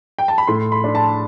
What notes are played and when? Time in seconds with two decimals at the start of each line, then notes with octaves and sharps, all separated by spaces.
0.18 G5
0.28 A5
0.38 B5
0.47 A2 C6
0.72 B5
0.84 D4
0.95 A5